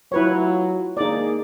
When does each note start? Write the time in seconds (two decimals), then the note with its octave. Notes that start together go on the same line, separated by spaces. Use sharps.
0.12 F#3 E4 F4 B4 C#5
0.97 A#3 D#4 G#4 D5